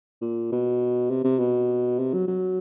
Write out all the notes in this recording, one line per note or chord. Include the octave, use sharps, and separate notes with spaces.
A#2
B2
C3
C3
B2
C3
F#3
F#3